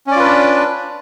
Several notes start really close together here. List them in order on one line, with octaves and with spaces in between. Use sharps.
C#4 D5 F4 B4 D4